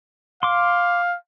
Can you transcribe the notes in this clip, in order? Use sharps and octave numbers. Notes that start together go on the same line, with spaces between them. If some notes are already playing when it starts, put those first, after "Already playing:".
F5 C6 D6